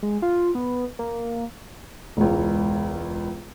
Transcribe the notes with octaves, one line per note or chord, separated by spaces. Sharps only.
G#3
F4
B3
A#3
E1 C#2